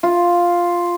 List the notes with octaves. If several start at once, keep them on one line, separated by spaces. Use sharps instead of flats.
F4